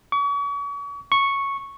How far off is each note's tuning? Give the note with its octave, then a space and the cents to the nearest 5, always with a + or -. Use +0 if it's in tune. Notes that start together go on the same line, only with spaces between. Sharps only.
C#6 +40
C#6 -5